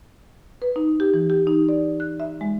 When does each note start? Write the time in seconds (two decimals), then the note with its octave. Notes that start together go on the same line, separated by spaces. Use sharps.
0.62 B4
0.76 D#4
1.00 G4
1.14 E3
1.30 G4
1.47 D#4
1.69 D5
2.00 F#6
2.20 E5
2.41 G#3